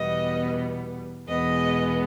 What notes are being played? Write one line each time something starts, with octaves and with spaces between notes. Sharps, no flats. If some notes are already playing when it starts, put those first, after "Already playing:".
Already playing: E2 B2 G3 B3 D#5
E2 B2 G#3 B3 D#5